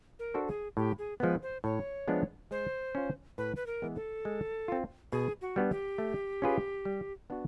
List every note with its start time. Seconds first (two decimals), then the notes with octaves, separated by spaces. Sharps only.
0.19 A#4
0.34 D4 F#4 A4 C5
0.48 G#4
0.77 A2 G4
0.99 G#4
1.20 F3 G#3 B3 B4
1.43 C5
1.64 A2 C#5
2.08 F3 G#3 B3 D4
2.51 G#3 C5
2.95 C#4 F4
3.38 A2 B4
3.56 B4
3.67 A#4
3.82 E3 G#3 B3
3.96 A4
4.25 G#3
4.68 C4 F4
5.12 B2 G#4
5.41 F#4
5.56 G3 B3 D4
5.71 G4
5.98 A3
6.42 C#4 F4 G#4 B4
6.85 G3
7.30 B3 D4 F#4